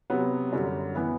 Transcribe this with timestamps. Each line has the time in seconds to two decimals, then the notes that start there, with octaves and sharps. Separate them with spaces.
0.10 C3 F#3 B3
0.53 F#2 D3 G3
0.95 E3 B3 E4